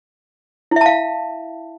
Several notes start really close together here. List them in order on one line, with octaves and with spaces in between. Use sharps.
E4 E5 A5 F5